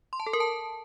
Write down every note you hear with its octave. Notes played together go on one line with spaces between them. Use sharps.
C6
A5
A4
A#4
A5